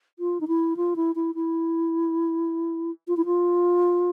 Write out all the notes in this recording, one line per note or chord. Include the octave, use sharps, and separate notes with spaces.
F4
D#4
E4
F4
E4
E4
E4
F4
E4
F4